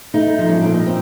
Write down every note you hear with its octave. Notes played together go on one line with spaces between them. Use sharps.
A3 D#4
F3
C#4
A#2 D4
D#4
C4